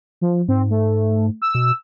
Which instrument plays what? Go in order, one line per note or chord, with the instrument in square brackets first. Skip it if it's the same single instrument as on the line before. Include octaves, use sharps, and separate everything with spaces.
[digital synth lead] F3
[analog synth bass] G#2 [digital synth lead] C4
[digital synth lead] A3
E6
[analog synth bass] B2